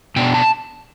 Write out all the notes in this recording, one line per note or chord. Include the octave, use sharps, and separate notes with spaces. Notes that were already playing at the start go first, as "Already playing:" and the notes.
B2 B3 D4 G5
A5